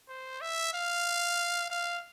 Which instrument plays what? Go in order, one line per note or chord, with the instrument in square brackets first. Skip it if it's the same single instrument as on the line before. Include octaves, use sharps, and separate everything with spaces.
[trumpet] C5
E5
F5
F5